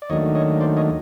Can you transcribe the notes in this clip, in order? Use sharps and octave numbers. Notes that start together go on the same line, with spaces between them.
D5
D#2 D#3 F#3 A3 D4 C#5 D#5
C#5 D#5
C5 D5
C#5 D#5